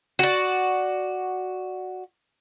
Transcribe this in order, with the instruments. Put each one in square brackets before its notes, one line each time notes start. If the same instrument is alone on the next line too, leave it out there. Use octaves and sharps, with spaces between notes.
[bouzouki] F#4 D5